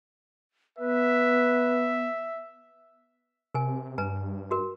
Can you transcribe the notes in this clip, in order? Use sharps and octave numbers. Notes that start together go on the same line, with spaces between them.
B3 B4 E5
C3 A#4 G#5
G2 B4 G#5 A#5
F#4 A#4